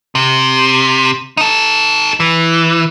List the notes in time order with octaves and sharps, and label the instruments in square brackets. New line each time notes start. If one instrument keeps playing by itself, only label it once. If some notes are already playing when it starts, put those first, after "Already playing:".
[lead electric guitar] C3
D#4 A4
E3